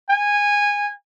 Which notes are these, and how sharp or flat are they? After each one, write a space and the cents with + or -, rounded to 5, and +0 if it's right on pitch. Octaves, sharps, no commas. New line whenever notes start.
G#5 -15